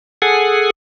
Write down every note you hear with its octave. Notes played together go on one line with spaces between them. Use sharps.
G#4 A4 F#5 G#5